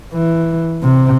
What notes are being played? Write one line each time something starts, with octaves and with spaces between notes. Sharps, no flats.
E3
C3